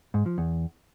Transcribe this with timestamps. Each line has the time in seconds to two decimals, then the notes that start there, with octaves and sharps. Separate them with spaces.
0.14 G#2
0.26 F3
0.38 E2